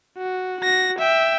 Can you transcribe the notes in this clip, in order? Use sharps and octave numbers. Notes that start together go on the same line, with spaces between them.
F#4
F#4 A#6
E5 G5